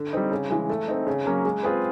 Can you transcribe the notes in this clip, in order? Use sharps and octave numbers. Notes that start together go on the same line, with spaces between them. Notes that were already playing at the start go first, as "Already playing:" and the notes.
Already playing: D3
G3 C4 D#4
C#3
E3 G#3
A3
C4 D#4
C#3
F#3 A#3 C#4
G#3
C4 F4 G#4 B4